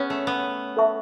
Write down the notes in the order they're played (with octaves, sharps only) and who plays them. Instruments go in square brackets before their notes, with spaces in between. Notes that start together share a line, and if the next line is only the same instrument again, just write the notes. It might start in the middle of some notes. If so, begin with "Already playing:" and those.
Already playing: [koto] B3 C#4 [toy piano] G#4 C#5
[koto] A3
B3
[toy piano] A4 E5 A5 C#6